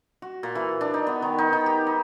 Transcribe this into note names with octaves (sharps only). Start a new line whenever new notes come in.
F#4
A#2
E3
D4
D#4
B3
D#3
D#4
D#3
G4
D#4